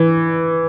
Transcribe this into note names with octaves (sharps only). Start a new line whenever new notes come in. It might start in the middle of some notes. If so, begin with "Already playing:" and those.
Already playing: E3